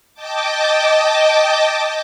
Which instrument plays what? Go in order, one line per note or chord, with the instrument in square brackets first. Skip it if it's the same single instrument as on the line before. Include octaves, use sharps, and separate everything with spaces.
[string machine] D#5 G5 A5 D6